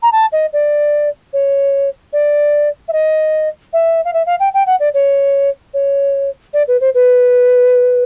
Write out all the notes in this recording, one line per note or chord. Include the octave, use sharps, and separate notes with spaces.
A#5
A5
D#5
D5
C#5
D5
E5
D#5
E5
F5
E5
F5
G5
G5
F#5
D5
C#5
C#5
D5
B4
C5
B4